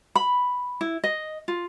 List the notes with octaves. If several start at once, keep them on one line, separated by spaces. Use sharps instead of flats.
B5
E4
D#5
F4